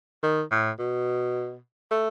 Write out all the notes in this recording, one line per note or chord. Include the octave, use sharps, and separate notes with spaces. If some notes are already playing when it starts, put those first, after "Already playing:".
D#3
A2
B2
A3